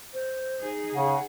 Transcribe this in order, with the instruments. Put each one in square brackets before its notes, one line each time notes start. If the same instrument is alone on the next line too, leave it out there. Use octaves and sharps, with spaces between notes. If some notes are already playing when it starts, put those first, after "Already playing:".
[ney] C5
[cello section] D#4 G#4
[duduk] C#3 [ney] F#5